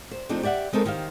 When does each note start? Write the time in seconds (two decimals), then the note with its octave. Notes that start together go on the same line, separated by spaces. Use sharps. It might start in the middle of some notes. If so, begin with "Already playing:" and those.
0.11 C5
0.29 F3 A3 C4 D4 D#4
0.43 G4 D5 E5 F#5
0.73 G#3 C4 D#4 A4 A#4
0.85 D#3 G4 C5 F5